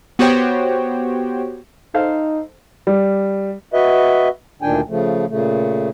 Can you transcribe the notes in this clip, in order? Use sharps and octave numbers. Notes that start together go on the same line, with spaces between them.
B3 F#4 G4 C5 C#5 G5
D#4 A4 C5 F5
G3
F#4 B4 D#5 E5
D2 A#2 D#3 D4 G5 G#5
C#3 F3 A3
A#2 C#3 A3